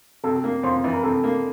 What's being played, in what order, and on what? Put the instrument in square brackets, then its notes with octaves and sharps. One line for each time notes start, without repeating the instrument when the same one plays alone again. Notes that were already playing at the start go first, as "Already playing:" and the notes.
[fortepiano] C3 [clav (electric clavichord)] A4
[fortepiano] A#3
[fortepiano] F2 [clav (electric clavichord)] C5
[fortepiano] E3
[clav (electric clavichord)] A#4
[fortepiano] C3 [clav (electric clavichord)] A4
[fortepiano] A#3